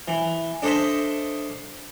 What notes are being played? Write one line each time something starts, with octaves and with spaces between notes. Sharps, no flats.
E3
D4 A4 C5 D#5 E5